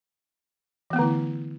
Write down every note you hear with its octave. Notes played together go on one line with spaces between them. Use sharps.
D3 E3 A3 B3 E4